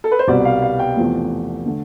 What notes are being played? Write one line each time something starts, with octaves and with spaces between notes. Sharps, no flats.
A4
B4
C5
C2 B2 G3 D5
F5
F5
G5
E2 C3 F3 A3
D3 A3